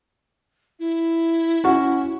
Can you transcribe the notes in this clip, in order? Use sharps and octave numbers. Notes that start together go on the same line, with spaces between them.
E4
C#4 F#4